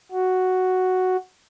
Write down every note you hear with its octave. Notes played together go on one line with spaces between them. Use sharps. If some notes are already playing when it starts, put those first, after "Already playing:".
F#4